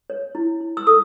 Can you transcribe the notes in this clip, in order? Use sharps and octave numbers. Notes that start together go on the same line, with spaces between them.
C#5
E4
E4
E6
A4 D#6